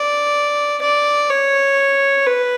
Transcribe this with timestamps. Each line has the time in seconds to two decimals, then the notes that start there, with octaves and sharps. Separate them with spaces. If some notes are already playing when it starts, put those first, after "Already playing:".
Already playing: D5
0.82 D5
1.29 C#5
2.26 B4